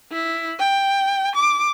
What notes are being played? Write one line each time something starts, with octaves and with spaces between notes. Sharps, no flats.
E4
G5
D6